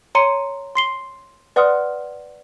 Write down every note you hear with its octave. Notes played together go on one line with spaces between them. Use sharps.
C#5 A#5 C6 C#7 D#7
C6 C7 G7
B4 D5 F#5 C6 D#6 F6